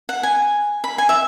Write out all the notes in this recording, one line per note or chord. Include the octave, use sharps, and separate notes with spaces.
F#5
G#5
B5
G#5
E5